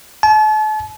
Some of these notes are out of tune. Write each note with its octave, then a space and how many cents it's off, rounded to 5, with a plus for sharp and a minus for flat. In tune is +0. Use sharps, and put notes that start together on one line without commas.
A5 -40